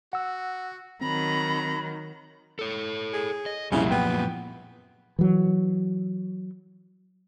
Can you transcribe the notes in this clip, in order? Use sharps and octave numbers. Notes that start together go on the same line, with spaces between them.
F#4 F#5 E6
D#3 F#3 C4 A#5 B5
A4 C#5
G#4
D#5
C2 F#2 A#2 C#3 F3 E4
B3 G5
E3 F#3